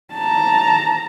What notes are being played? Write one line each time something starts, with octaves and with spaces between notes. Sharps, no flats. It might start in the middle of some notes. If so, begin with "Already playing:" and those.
A5 A#5